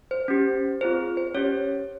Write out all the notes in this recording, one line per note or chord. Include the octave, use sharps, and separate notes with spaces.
C5
C#4 G4
C4 F4 G#4 C5
C5
C#4 G4 C#5